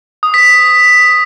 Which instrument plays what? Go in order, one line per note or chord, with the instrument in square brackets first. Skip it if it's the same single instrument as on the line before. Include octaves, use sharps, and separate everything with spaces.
[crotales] D#6
B6
B6